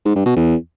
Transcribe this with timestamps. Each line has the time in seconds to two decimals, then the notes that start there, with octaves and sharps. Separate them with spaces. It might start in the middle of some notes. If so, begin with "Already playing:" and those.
0.05 G#2
0.16 G2
0.26 B2
0.36 E2